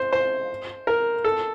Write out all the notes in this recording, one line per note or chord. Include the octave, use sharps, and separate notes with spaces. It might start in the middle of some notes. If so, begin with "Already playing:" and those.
Already playing: C5
C5
A#4
A4